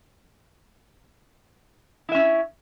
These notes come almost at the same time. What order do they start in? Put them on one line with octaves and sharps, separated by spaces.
E4 E5 C#4